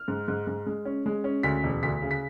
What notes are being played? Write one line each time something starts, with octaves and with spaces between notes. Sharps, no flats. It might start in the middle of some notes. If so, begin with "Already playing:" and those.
Already playing: F6
G#2
G#2
G#2
G#3
C#4
G#3
C#4
D2 B6
E1
D2 B6
C#3
B6